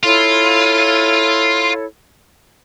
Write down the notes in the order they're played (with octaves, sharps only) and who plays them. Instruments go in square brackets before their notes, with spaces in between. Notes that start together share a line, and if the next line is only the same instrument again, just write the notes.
[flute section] E4 A4 C#5 [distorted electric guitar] F4